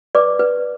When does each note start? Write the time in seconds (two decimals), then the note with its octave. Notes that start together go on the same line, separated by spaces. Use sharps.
0.15 B4 D5 D6
0.39 B4